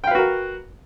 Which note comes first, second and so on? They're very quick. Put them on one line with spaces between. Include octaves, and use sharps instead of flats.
G5 F5 B4 F#4 A#4